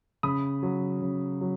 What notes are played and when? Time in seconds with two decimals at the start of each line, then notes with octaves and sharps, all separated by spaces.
0.23 C#3 B5 D#6
0.63 F#3
1.02 C#3
1.41 F#3